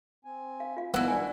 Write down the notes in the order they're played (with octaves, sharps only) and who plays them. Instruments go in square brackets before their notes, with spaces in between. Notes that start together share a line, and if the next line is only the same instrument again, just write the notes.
[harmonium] C4 G#5
[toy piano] F5
F4 F5
[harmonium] G#2 D#3 D4 [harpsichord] B3 [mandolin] E4 F#4
[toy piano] D5 G#5